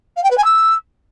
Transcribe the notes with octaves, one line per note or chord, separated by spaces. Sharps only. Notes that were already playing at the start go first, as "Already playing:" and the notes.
F5
G5
B4
G#5
E6